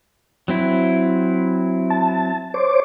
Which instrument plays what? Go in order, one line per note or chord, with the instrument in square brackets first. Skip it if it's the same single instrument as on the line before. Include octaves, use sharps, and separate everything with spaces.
[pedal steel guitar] F#3 C4 E4
[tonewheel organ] A5
C5 C#5 D6